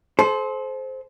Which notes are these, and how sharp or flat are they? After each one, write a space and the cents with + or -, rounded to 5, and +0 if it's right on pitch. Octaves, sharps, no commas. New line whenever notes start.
A4 -40 C5 +0